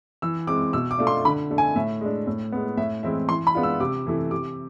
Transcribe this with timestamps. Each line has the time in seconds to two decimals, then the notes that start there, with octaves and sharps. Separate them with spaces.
0.22 E3 E6
0.47 G#3 C4 D6
0.73 B2 E6
0.91 D6
0.99 A3 D4 F4
1.07 C6
1.25 D3 B5
1.50 A3 D4
1.58 G#5
1.76 A2 E5
2.01 G#3 D4
2.27 A2
2.52 G#3 B3
2.77 A2 E5
3.03 E3 G#3 C4 E4 E5
3.29 E3 C6
3.47 B5
3.55 G#3 B3 D4 F4
3.63 E6
3.80 C3 D6
4.07 E3 A3 E4
4.31 C3 D6